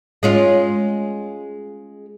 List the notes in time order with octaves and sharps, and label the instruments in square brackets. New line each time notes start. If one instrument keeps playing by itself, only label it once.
[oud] G#3 C#4 F4